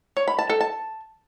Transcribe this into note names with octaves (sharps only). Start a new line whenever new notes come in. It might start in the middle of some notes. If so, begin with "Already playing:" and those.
C#5
B5
A5
A4
A5